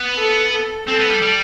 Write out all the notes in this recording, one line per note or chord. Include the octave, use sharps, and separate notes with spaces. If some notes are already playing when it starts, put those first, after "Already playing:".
Already playing: B3
A4
A4
C4 A4
B3
G3
G3